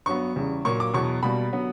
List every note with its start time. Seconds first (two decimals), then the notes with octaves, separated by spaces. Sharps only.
0.06 G2 F#3 B3 C#6
0.36 E2 C#3 G3
0.64 A#2 F#3 A#3 C#6
0.80 D6
0.93 E2 B2 F#3 B3 C#6
1.23 B2 G3 A#3 B5
1.52 D3 F#3 B3